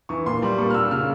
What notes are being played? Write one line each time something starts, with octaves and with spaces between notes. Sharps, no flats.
E3 C#6
A#2 C6
G3
A#2 C#6
F6
A#2 E6
C#3 F6